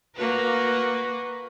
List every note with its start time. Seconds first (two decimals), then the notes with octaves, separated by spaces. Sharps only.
0.16 A#3 F#4 B4